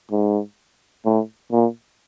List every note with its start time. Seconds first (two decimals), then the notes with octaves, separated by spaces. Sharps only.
0.11 G#2
1.06 A2
1.52 A#2